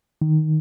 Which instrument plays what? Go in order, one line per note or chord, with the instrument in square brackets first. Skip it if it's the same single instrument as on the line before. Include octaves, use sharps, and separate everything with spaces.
[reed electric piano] D#3